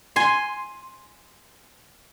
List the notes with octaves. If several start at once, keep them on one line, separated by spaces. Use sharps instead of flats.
G#5 C6